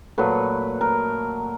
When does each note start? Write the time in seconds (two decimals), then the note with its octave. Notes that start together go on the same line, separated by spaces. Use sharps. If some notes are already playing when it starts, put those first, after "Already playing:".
0.18 A#2 F#3 A3 B4
0.81 A#4